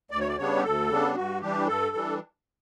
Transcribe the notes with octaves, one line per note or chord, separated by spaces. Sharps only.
D2 D5
C#5
D5
C#3 G3 B3 D4 C#5
G4
D2 A4
C#3 G3 B3 D4
G2 F#4
E3 G3 D4 G4
G2 A4
E3 G3 D4